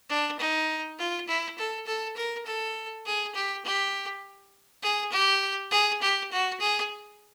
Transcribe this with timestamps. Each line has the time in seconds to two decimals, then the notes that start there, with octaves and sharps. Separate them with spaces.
0.09 D4
0.39 D#4
0.99 F4
1.27 E4
1.58 A4
1.86 A4
2.16 A#4
2.46 A4
3.05 G#4
3.35 G4
3.65 G4
4.83 G#4
5.12 G4
5.71 G#4
6.02 G4
6.31 F#4
6.60 G#4